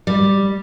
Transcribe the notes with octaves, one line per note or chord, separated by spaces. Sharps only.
G3